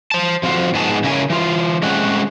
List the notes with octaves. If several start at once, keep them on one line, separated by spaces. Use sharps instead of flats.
C5 A5
F3 C4 F4 F#4 C5
G#2 B3 G#4 A5
C#3 C#4 E4 A#4 G#5
E3 F4
G#3 A3 C4 C#4 F#5